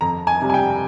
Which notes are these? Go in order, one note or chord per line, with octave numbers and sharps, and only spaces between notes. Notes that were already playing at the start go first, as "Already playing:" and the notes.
F2 A#5
G#5
C3 G3
G#5
G5